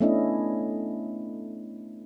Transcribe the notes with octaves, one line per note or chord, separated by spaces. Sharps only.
A3 B3 C#4 D4 E4 D#5